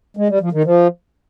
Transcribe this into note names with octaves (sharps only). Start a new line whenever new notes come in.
G#3
G3
F3
D#3
F3